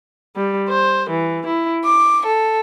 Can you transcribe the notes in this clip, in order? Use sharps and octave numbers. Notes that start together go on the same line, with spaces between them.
G3
C5
E3
E4
D6
A4